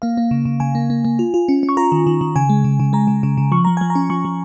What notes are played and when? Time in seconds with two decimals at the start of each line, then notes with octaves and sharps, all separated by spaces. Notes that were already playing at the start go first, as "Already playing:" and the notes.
0.02 A#3 F5
0.17 A#3
0.31 C#3
0.45 C#3
0.60 C#3 G#5
0.75 A#3
0.90 A#3
1.05 A#3
1.19 F4
1.34 F4
1.49 C#4
1.63 C#4
1.69 C#6
1.77 F4 A#5
1.92 D#3
2.07 D#3
2.21 D#3
2.36 C#3 G#5
2.49 G#3
2.64 C#3
2.80 C#3
2.93 G#3 A#5
3.07 C#3
3.23 C#3
3.38 C#3
3.52 F3 C#6
3.65 F3 A#5
3.77 F3 G#5
3.90 A#5
3.95 C#4
4.10 F3 C#6
4.25 F3